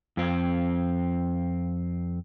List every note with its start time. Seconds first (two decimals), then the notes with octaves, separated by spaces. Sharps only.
0.17 F2 C4